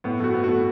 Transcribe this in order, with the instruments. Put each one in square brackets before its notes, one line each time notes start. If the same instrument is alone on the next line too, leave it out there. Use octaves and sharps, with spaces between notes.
[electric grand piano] A2 [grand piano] B3
[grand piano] A3 [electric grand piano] F#4
[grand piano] B3
[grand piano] A3 [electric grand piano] F#4